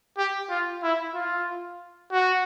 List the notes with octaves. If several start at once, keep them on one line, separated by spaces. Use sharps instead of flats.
G4
F4
E4
F4
F#4